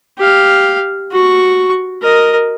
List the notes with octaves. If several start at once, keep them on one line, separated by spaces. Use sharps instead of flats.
G4 F5
F#4 C#6
A#4 D#5